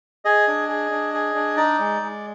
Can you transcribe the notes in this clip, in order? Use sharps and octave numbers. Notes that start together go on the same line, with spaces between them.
G#4 D#5
D4
G#4
D4
G#4
D4
D#4 D5
G#3
G#3